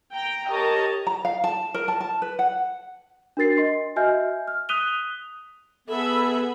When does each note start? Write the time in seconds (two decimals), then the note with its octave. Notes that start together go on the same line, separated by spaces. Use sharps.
0.14 G5 A#5
0.48 G4 A#4 C#5 D#5 A5 A#5
1.07 A#5
1.25 F5
1.44 A5
1.74 A#4
1.88 A5
2.01 A5
2.22 B4
2.39 F#5
3.37 D4 F#4 A#4 A6 C7
3.57 D#5 C6 C7
3.96 F#4 D#5 E5 G#5 F6 G6
4.48 F6
4.69 D#6 F#6 B6 D#7 F7 G7
5.88 B3 G#4 A4 E5 B5